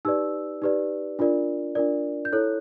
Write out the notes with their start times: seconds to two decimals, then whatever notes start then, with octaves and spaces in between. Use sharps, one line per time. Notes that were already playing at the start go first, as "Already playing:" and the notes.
0.05 D#4 G4 B4 D5 E6
0.62 D#4 G4 B4 D5
1.19 D4 F4 A#4 D5
1.75 D4 F4 A#4 D5
2.25 G6
2.32 E4 A4 C#5 F#6